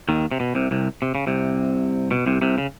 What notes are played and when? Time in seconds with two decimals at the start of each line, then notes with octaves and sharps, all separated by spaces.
0.09 D#2 D#3
0.31 C3
0.40 B2
0.55 C2 C3
0.71 C2 C3
1.02 C3
1.15 C#3
1.27 C2 C3
2.11 B2
2.26 C2 C3
2.42 C2 C3
2.58 C#3